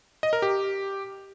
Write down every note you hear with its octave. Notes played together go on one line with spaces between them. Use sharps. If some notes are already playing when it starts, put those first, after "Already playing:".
D#5
A#4
G4